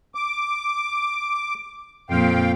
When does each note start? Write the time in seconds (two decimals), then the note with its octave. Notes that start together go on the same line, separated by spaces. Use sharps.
0.15 D6
2.10 F2 A#2 F5 G5